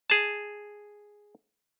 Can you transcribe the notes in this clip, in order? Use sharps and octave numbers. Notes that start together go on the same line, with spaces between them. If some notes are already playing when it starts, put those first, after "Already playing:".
G#4 A5